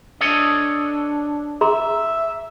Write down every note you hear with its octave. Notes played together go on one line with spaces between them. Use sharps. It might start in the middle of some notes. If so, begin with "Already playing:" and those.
D4 A4 C#5 D#5
G#4 E5 A#5 C6